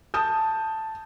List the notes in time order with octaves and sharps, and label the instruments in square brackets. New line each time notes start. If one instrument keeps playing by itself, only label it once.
[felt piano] A5 D#6 G6